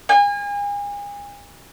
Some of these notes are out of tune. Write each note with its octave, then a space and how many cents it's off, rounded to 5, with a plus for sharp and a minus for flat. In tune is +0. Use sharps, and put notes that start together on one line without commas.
G#5 -35